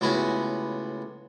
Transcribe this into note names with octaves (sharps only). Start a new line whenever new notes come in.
C#2 A2 B3 F#4 B4 G#5